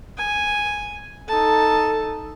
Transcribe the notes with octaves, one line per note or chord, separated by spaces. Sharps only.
G#5
D#4 A4 A5